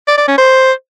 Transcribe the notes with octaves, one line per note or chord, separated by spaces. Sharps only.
D5
D5
C#4
C5